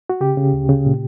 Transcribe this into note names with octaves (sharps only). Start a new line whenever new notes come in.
F#4
C#3 G4
C#3
D2
C#3
A#2